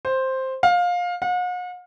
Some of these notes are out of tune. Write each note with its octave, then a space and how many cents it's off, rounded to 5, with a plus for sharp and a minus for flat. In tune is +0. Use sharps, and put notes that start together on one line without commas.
C5 +5
F5 +20
F#5 -45